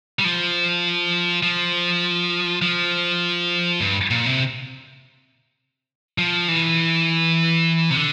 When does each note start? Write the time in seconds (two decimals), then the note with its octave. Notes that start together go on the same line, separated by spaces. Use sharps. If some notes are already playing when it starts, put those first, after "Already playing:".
0.19 G3
0.25 F3
1.43 F3
2.62 F3
3.81 G2
4.11 A#2
4.26 C3
6.18 F3
6.48 E3
7.90 C3
7.96 D3